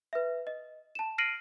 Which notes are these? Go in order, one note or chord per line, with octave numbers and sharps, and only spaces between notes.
B4 E5
D#5
A5 E7
F6 A#6 C7 D7 D#7 F#7